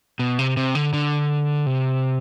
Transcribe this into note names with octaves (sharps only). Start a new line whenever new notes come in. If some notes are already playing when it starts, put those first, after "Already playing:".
B2
C3
C3
D3
D3
C3